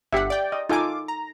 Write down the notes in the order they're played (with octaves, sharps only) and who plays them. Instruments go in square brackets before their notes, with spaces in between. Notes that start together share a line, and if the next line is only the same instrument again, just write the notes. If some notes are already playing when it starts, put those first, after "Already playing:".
[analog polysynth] G1 F#5 [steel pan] G4 E5
[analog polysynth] D5 G5
[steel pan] D#5
[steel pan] D#4 A4 G#5 [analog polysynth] F4 D6
[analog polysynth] A#5